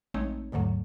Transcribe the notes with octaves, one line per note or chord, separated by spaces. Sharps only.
A#1 G#3 A3 C4 D#4 C#5
D#2 G#2 D3 F#3 A3